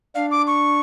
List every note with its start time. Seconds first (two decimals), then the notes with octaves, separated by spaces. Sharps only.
0.15 D4 F5
0.31 D6
0.47 C#6